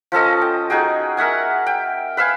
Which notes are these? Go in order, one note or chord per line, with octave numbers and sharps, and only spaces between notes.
F3 C#4 A4 D#5
G5
D#4 F#4 G#4 G5
A#4 E5 F#5 G#5
G5
B4 E5 F5 G#5